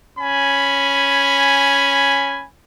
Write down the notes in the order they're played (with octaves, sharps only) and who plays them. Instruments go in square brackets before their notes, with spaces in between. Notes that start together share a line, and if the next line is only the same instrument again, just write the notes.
[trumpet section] C#4 G#5 B5